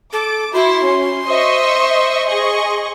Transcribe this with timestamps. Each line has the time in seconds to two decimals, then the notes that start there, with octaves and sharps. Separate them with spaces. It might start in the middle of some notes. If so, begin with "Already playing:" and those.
0.13 A4 D6
0.54 E4 F#4 C6
0.83 C#4
1.28 C5 D#5 E5 C#6
2.26 G#4 D#5 C#6